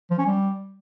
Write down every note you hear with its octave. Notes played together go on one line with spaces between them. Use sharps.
F3
C#4
G3